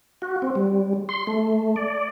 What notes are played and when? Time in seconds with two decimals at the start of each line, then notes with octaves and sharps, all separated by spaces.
0.22 F#4
0.42 C4
0.55 G3
1.09 C6
1.27 A3
1.76 D5